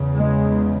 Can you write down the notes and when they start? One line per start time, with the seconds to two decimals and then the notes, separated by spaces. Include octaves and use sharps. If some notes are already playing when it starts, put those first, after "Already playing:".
Already playing: E2 C#3
0.16 G#3